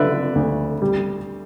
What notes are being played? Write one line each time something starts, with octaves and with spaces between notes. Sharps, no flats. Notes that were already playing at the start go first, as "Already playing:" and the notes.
Already playing: D3 B4 D5 E5
D2
G3